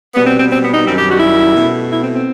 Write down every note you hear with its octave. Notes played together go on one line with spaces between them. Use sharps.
B2 G3 B3
C4
C4
C4
B3
D#4
F#2 D#3 G3 C4
G4
F#4
E4
B2 A3
E4
C4
C4